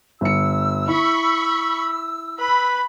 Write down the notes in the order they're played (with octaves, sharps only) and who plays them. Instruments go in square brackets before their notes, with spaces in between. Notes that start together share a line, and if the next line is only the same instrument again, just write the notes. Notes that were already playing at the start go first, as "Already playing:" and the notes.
[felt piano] G1 C#7 [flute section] E6
[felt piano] E4 [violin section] B5 C#6
[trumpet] B4 [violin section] B5